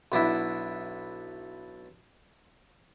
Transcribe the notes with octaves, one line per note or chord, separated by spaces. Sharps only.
B1 B3 D4 E4